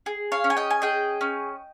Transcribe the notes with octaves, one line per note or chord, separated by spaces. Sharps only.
G#4
C#5 F5
C#4
G#5
D#5 G5
G#5
G#4 D#5 G5
C#4